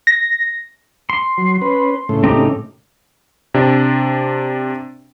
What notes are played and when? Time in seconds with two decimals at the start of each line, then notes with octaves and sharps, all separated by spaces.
0.07 A#6
1.10 C6
1.38 F#3
1.61 C#4 B4
2.09 A2 C#3 A3
2.24 C4 D#4 G4
3.54 C3 D4